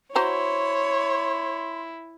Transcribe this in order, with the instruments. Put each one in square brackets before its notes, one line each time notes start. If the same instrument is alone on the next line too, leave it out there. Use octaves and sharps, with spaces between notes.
[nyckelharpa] E4 [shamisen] F#4 C5 A#5 [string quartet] C#5 [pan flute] C6